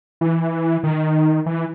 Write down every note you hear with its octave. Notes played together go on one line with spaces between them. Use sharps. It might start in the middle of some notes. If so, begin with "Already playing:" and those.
E3
D#3
E3